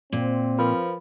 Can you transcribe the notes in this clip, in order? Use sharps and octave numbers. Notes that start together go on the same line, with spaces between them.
A#2 C4
F3 A#4 B4 B5